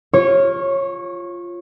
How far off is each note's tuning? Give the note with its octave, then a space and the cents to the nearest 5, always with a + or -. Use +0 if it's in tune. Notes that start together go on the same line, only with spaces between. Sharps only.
F4 +0 C#5 -20 C#6 +25